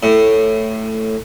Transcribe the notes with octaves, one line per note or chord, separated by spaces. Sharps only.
A2